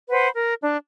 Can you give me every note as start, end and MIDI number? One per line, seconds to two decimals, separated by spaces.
0.09 0.27 71
0.09 0.27 72
0.09 0.27 78
0.09 0.27 83
0.33 0.53 70
0.63 0.77 62